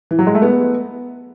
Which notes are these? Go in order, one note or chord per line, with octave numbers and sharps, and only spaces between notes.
E3
F#3
G#3
A3
B3